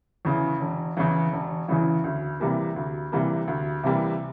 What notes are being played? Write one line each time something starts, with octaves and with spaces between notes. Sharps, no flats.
E2 C#3 E3
E1
E2 C#3 E3
E1
E2 C#3 E3
D2
C3 E3 G3 A#3
D2
C3 E3 G3 A#3
D2
C3 E3 G3 A#3